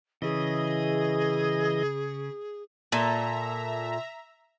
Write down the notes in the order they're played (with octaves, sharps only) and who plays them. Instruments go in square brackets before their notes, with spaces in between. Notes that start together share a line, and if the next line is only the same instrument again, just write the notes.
[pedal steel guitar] C#3 [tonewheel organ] E3 D#5 [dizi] G#4
[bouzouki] A#2 A4 [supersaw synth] E5 A#5